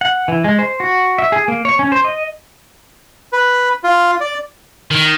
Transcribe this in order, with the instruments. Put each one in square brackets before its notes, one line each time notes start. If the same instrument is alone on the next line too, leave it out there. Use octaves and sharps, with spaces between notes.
[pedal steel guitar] F#5
E3
G#3
C5
F#4
E5
G#4
A#3
C#5
C#4
C5
D#5
[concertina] B4
F4
D5
[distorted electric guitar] D#3